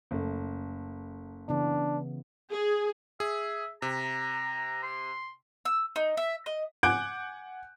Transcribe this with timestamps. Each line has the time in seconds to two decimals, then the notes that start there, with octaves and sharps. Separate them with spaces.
0.11 F#1 A3
1.49 C#3 E3 B3 D4
2.51 G#4
3.20 G#4 E5
3.82 C3 A#5
4.83 C6
5.65 E6
5.96 D#4
6.17 E5
6.46 D#5
6.83 F#5 G#5 D6 F#6 G6 D7